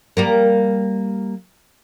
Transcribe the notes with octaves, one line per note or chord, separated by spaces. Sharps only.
G3 A#3 A#4